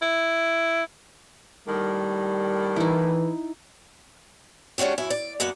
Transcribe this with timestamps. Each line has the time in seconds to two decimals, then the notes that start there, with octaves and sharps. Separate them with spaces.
0.02 E4
1.68 A2 D#3 G3 A#3
2.76 E3 D#4 E4
4.78 G#3 C#4 D4 F#4 G4
4.98 F#2 E4 G#5
5.10 D5
5.40 F#2 A#3 B3 F#5